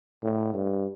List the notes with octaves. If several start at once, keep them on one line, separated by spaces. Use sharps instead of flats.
A2
G2